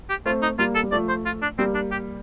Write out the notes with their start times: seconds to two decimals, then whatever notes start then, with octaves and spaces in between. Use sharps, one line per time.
0.09 G4
0.26 A3 C4 F4
0.42 D#4
0.59 G3 A#3 F4
0.75 A4
0.83 G3
0.92 F3 A3 D5
1.09 C5
1.26 F4
1.42 D4
1.58 G3 A#3 C4
1.74 D4
1.91 G4